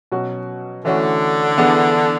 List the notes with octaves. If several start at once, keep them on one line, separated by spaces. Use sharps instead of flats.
B2 F#3 C#4 F#4
D3 E3 A3 C#4 F#4
E3 B3 D4 G#4